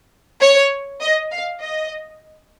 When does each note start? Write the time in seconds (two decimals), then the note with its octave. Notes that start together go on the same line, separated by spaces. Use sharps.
0.41 C#5
1.00 D#5
1.31 F5
1.60 D#5